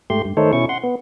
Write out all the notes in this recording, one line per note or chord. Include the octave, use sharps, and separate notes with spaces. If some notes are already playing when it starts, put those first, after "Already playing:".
G#2 A3 G4 C6
G2
D#3 A3 D#4 A4 C5 C#5
B2 C#4 E4 C#6
F#5 C6
B3